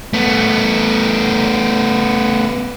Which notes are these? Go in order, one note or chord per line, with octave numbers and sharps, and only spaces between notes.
A3 B3